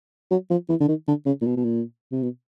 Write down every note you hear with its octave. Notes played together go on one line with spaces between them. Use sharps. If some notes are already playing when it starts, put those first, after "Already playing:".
F#3
F3
E3
D3
D#3
D3
C#3
A#2
B2
B2
A#2
C3
B2